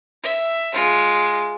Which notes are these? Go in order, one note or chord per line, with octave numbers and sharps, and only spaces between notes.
E5
G#3 F4